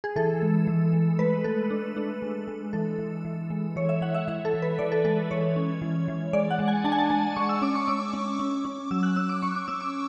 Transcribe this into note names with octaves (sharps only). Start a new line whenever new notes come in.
G#4
E3 A4
G#3
E3
G#3
A3 B4
A3 A4
D4
D4
G#3
G#3
E3 A4
E3
E3
G#3
E3 C#5
E5
E3 F#5
E5
E3 E5
A4
E3
B4
E3 D5
A4
G#3 A4
E3 C#5
C#4
E3
E3
G#3 D5
F#5
G#3
G#5
D4 A5
G#5
A5
G#3 A5
G#3 C#6
E6
C#4 D6
C#6
C#4 D6
C#4
C#4
C#4
F#3 E6
F#6
C#4 E6
D6
C#4 C#6
D6
C#4 E6
D6